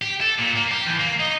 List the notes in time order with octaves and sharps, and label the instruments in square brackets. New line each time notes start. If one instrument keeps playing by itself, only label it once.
[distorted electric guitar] G4
A4
A#2
A#3
G4
E2
A#3
D#4